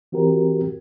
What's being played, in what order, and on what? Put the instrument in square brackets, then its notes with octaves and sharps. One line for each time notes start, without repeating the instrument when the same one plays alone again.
[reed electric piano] E3 C4 F#4 G4 A#4